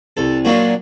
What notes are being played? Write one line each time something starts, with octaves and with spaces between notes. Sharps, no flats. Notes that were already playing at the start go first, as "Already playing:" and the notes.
C2 A4
A#2 F#3 A#3 D4 F#4